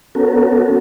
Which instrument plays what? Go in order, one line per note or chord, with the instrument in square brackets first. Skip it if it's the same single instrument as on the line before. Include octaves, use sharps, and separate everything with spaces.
[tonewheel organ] B3 C#4 F#4 A4 A#4